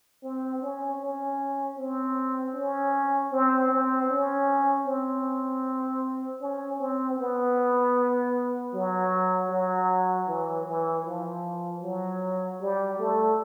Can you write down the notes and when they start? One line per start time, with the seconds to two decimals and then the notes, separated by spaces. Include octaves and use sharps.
0.23 C4
0.62 C#4
1.01 C#4
1.78 C4
2.55 C#4
3.32 C4
3.72 C4
4.10 C#4
4.87 C4
6.41 C#4
6.80 C4
7.19 B3
8.74 F#3
9.51 F#3
10.28 E3
10.67 E3
11.05 F3
11.83 F#3
12.61 G3
12.99 A3